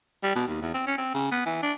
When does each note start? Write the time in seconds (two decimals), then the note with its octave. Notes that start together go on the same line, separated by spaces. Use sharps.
0.23 G3
0.35 B2
0.48 D#2
0.61 E2
0.74 C4
0.86 C#4
0.98 C4
1.14 C#3
1.31 B3
1.46 E3
1.62 D4